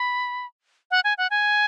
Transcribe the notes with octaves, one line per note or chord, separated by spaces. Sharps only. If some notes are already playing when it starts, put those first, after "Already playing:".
Already playing: B5
F#5
G#5
F#5
G#5